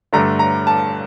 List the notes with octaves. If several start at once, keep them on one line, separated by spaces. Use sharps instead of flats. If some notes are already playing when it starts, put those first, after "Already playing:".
G2 D3 A3 D4 A#5
A#5
A5